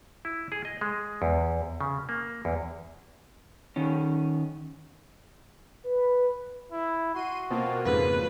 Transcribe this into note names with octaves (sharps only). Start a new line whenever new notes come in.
E4
G#4
D#5
G#3
E2
C#3
A#3
E2
D#3 C#4
B4
E4
F#4 C6 D#7
B2 A#3 C4 F4 D#5 A5
F2 G#2 C#3 B4